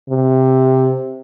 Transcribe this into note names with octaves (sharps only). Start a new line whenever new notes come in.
C3